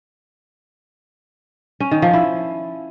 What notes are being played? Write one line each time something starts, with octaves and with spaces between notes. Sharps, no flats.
C#4
D#3
F3
E4